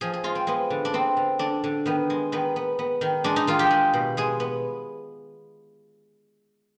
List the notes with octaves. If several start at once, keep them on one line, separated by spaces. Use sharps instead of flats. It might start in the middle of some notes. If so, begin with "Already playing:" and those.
F3 G#4
G#4
G#3 F4
C4
G#3 B3
D3
D4
B3 C4
D3
D3 D4
D3
D#3 B3
G#3
D#3 B3
B3
B3
D#3
G#3 D4
D#4
D#3 F4
G4
G#3
B2
G#3 G#4
B3